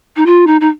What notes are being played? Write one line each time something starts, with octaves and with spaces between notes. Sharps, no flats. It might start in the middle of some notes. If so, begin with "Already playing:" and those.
D#4
F4
D#4
D#4